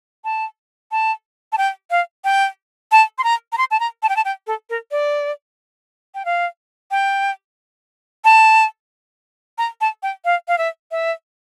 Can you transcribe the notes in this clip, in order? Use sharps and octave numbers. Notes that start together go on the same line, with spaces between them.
A5
A5
A5
G5
F5
G5
A5
C6
A#5
A#5
C6
A5
A#5
A5
G5
A5
G5
A4
A#4
D5
G5
F5
G5
A5
A#5
A5
G5
F5
F5
E5
E5